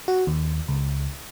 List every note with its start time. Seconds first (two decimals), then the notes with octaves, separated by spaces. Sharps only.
0.08 F#4
0.27 D#2
0.68 C#2